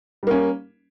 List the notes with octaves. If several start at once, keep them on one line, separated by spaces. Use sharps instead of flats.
G3 A#3 C#4